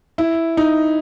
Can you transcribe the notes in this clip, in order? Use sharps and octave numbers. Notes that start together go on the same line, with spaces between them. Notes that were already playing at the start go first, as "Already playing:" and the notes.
E4
D#4